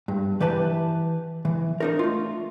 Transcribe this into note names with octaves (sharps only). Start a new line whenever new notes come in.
G2
E3 G4 B4 A5
E3
D4 D#4 A#4
A3 F4